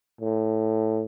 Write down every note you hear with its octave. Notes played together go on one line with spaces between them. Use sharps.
A2